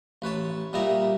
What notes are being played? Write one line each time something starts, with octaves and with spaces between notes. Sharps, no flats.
A1 B4 C#5 A5
A#2 G3 D#4 E4 A#5